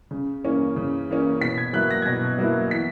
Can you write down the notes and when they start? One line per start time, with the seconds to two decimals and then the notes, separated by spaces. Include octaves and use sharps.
0.11 C#3
0.44 E3 A#3 C#4
0.76 C#3
1.09 E3 A#3 C#4
1.41 B2 B6
1.58 G#6
1.73 F#3 A#3 E4 F#6
1.90 A#6
2.02 G#6
2.06 B2 A#6
2.38 F#3 A#3 E4
2.70 E3 B6